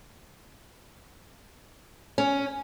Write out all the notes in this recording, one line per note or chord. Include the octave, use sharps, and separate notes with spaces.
C#4